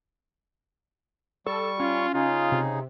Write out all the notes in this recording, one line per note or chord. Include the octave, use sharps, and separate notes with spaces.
G3 A4 C#6
C#4 F4
C#3 D#4 F4 G#4
C3